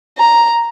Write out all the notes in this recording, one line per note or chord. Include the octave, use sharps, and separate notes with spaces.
A#5